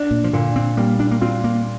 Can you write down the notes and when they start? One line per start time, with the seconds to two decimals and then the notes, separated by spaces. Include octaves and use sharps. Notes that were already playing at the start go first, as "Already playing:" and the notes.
Already playing: D4
0.11 A#2
0.24 F3
0.33 A#2 D3
0.56 C4
0.77 G3 A#3
1.00 D4
1.11 A#3
1.21 C4 F4
1.44 A#3